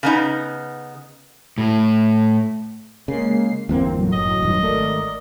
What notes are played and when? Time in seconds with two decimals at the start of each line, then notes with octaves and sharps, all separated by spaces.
0.03 C#3 B3 D#4
1.58 A2
3.08 C#3 G#3 A#3 C7
3.69 G1 E2 A#3 C4
3.97 A2 F#3
4.12 F#1 D#5
4.42 D#1 G2
4.63 G#1 A3 A#4 D5